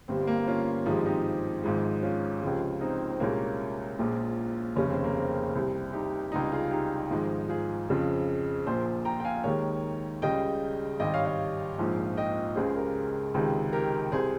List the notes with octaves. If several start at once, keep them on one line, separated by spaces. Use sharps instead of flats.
G1 G2 G3 C4
A#3
C#4 F4
G#1 G2 F3 G#3 C4 D#4
D#4 G4
G#1 G#2 F3 G#3
C#4 F4
C#2 C3 F3 G#3
C4 D#4
C4
C2 A#2 G#3 A#3 C#4
A#1 A#2 F3 G#3
F1 D#2 C#3 C#4
C4
A#3
C4
C2 C3 G3
D#4 G4
C#2 C3 G3 D#4 G4
F4 G#4
D#4 G4
G#1 G#2 F3 G#3
F4 G#4
F2 C#3 F3
A#1 A#2 F3 G#4 C5
G5 A#5
G5
F5 G#5
D#2 D#3 G#3 A#4 C#5
C#2 C#3 G3 D#5 G5
G#1 G2 G3 D#5 G5
C#5 F5
C#5 F5
A#1 G#2 F3
D#5 G5
C#2 C#3 G#3 G#4 C5
G4 A#4
C#2 C3 D#3 G#3
G4 A#4
C2 C3 G3 G#4 C5